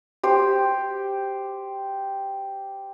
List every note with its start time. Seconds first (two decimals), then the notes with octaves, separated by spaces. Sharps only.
0.23 G4 C5